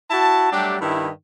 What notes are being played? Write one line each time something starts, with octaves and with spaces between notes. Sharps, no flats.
E4 F#4 A5
F#3 G3 A3 D4 G4
G2 D#3 E4